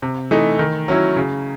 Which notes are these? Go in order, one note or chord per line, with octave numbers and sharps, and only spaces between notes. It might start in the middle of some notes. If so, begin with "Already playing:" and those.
C3
E3 A3 D#4
D#3
F#3 C#4 E4
C#3